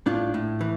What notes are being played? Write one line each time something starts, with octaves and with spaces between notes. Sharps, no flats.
A2 D4 F4
A2
E3